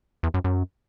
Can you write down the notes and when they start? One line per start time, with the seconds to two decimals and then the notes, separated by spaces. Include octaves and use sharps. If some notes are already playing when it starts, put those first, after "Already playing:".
0.23 E2
0.34 F#2
0.44 F#2